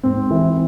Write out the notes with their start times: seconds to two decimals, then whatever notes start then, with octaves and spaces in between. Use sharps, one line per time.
0.03 G#2 C4
0.31 E3